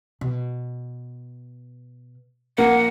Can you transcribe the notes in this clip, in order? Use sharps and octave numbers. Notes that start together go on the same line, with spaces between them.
B2
A#1 A#3 F#5